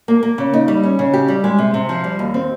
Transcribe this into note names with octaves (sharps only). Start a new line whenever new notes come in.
A#3
A#3
C#3
D#4
G3
C#4
C#3
G4
G3
G#3
C3
C3
F3
G3
D#2
C4